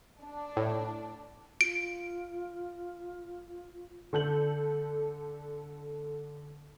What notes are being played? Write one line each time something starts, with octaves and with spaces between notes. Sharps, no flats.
D4
A2
F4 D7
D3 A4 G6 F#7